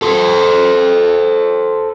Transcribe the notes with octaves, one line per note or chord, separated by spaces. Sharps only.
A4 C5